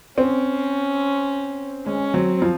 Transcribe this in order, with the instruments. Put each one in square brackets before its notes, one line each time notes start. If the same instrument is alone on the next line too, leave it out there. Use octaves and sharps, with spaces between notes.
[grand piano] C4 [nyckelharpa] C#4
[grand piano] G#3 [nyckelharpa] C#4
[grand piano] F#3 [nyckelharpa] C4
[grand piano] F3